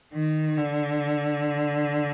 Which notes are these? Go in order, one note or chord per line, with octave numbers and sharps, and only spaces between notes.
D#3
D3